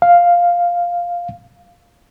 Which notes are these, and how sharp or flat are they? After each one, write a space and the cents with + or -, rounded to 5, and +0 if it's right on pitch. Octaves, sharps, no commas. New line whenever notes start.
F5 +0